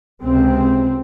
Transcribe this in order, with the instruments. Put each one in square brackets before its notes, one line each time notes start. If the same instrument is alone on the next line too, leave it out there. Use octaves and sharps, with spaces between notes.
[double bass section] C#2 C3 C4